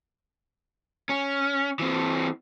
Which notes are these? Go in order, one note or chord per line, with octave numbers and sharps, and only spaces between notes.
C#4
E3 C4